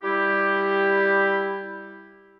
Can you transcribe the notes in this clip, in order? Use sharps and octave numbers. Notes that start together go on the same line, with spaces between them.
G3 E4 G4